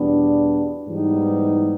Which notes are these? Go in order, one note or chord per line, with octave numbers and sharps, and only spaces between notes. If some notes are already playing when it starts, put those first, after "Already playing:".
Already playing: E2 B2 G3 B3 D4
G#2 E3 G3 B3 D#4